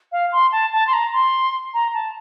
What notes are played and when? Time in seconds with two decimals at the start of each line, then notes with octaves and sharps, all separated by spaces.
0.12 F5
0.32 C6
0.52 A5
0.72 A5
0.87 C6
0.93 A#5
1.13 C6
1.74 A#5
1.94 A5